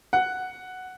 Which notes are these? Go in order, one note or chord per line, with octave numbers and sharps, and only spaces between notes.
F#5